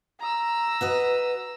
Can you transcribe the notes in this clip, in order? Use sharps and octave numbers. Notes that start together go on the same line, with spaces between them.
A#5 E6
F#4 B4 D#5